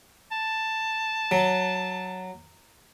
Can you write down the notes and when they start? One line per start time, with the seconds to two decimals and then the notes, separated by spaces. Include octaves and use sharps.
0.32 A5
1.31 F#3